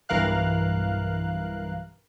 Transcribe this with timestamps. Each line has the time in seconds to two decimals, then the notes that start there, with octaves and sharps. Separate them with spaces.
0.09 B1 G2 E3 A#4 F5 F#6